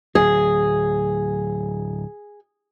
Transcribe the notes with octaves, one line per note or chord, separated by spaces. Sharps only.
D1 F#3 G#4